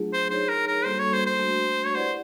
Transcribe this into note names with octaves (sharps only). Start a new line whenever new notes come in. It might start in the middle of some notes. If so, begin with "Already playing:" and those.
Already playing: F#3 A3 D4 F4 G#4
C5
D#4 G#4 C5 C#5
A#4
A#4
G3 A#3 D4 F#4 A4 C5
C#5
C5
C5
A3 D4 F#4
C#5
E4 G4 B4 C5 D5 F#5